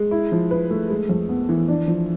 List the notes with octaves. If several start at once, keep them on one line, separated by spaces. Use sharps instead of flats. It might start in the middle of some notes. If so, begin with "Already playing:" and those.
Already playing: G#3
E4
F3
B4
A3
G#3
F2
B3
E3
D4
F3